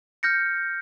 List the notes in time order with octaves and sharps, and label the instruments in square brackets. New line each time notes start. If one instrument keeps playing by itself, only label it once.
[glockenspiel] F6 G6 A#6 C#7